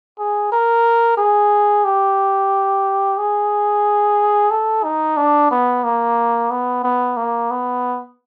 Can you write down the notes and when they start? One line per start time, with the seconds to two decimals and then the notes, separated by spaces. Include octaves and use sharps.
0.18 G#4
0.52 A#4
1.17 G#4
1.85 G4
3.18 G#4
4.51 A4
4.84 D#4
5.17 D4
5.51 B3
5.84 A#3
6.51 B3
6.84 B3
7.17 A#3
7.51 B3